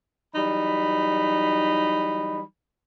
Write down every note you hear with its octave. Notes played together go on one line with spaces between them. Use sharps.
E3 F#3 G3 D#4 B5